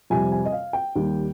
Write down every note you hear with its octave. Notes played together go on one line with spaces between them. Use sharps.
F2 C3 G3 G#5
G#5
D#5
F5
G5
D#2 D#3 G3